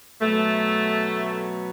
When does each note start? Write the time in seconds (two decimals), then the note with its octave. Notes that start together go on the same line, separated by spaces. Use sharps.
0.21 B2 F#3 A3